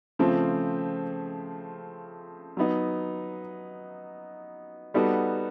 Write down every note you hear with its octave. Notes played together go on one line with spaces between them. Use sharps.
C#3 F3 A3 C4
F#3 B3 D#4
G3 B3 D#4 F#4 A4